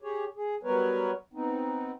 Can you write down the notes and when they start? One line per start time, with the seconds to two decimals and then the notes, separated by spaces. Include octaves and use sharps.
0.01 G4 G#4 C#5
0.36 G#4
0.63 F#3 G3 B3 A#4 B4 C#5
1.34 B3 C4 D#4